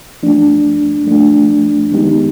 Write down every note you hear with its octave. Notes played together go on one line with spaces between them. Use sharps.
F3 A3 D4
F3 A3 D4
D#3 G#3 B3 D#4 G4